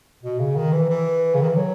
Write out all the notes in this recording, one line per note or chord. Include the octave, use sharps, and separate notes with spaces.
B2
C#3
D#3
E3
E3
C#3
D#3
E3
F#3